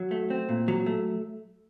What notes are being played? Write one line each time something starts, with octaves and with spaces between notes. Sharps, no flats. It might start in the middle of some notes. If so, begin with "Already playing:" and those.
Already playing: F#3
A3
C4
A#2
F#3
A3